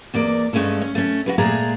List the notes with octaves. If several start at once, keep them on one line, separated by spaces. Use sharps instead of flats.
E2 A#3 D5
G2 G#3 A3 C#4 A4
C#4
A3 C#4
F#4 G#4 B4
A#2 G#3 A3 G#4 A#5